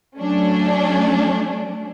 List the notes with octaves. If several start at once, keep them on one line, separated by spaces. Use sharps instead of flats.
F#3 A3 C#4 D4